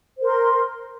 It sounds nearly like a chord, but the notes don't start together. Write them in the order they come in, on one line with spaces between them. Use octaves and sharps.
C5 A#4 C6